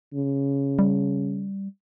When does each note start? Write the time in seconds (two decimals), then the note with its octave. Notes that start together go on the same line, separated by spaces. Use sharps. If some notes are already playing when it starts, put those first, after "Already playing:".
0.14 C#3
0.79 G3